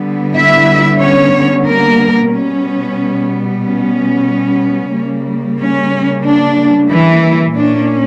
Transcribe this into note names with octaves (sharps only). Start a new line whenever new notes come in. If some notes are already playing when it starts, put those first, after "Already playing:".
Already playing: D3 G3 B3
E4 E5
C#4 C#5
A#3 A#4
B2 G3 B3 C#4
C#4
C#3 G3 A#3
C#4
D4
E3 E4
A#2 A#3 C#4 D4